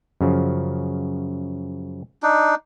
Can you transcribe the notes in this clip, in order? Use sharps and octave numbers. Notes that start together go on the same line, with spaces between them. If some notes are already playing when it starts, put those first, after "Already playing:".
F#2 C#3 F3
D4 D#4